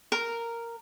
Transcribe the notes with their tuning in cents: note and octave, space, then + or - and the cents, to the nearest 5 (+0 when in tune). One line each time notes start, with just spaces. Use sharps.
A#4 -5